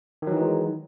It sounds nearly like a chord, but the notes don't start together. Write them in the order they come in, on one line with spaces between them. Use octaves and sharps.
D#3 F#3 E3 D#4 G#3